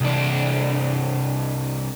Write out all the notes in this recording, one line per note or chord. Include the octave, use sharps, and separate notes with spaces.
C2 D4